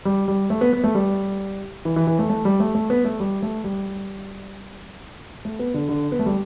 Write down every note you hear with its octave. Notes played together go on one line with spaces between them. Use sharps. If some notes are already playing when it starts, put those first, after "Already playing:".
G3
G3
A3
B3
B3
A3
G3
E3
E3
E3
A3
A3
G3
A3
A3
B3
A3
G3
A3
G3
A3
B3
D3
D3
B3
A3
G3